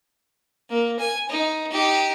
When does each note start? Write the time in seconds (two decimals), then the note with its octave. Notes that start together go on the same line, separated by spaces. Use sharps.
0.70 A#3
0.99 G#5
1.29 D#4
1.72 D#4 G4